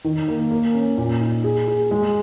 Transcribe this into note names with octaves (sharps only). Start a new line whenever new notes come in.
D#3
A#3
A#3
C#4
A#2
D#4
G#4
G#4
G#3